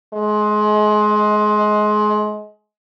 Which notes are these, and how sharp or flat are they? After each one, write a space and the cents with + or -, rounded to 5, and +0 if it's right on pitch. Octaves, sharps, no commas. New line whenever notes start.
G#3 +25